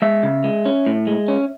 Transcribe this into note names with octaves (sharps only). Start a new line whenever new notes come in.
G#3 E5
C#3
G#3
C#4
A2
G#3
C#4